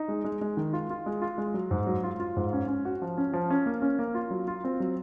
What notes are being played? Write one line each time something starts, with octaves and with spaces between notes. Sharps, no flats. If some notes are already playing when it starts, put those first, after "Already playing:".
Already playing: D#4
G#3
G#3
G#3
D#3
F4
F4
G#3
F4
G#3
F#3
G#2
F#3
F4
F4
G#2
C#4
C#4
F#4
F3
C#4
F3
C#4
A#3
C#4
A#3
F4
F#3
F4
C4
F#3